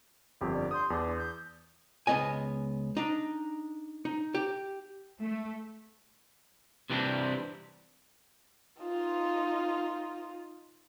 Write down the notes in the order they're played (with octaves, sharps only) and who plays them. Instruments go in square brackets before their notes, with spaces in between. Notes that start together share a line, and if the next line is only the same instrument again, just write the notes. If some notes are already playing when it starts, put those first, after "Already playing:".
[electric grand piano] G1 F2 G4
[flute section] D5
[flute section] C6 G6 [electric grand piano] D#6
[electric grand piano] E2 [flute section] D4
[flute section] G6
[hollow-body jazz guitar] C#2 C3 B3 D#5 G#5
D4 D#4
D#4
G4
[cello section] A3
[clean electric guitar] C3 E3 G3 C4 D4
[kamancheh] D#4 F4